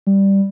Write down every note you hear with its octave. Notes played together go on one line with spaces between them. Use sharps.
G3